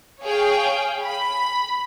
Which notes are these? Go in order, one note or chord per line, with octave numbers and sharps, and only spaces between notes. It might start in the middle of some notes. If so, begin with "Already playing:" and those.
G#4 C#5 F5 G5
B5